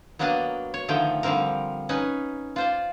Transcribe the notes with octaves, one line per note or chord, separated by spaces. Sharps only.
F#3 A#3 B3 D4 D5 D#5
C#5
D3 D#3 F3 A3 G5
D3 F3 G3 C4 A#4
C#4 D#4 B4
F4 C5 D5